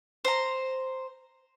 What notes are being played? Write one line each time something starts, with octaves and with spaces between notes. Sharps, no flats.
C5 A#5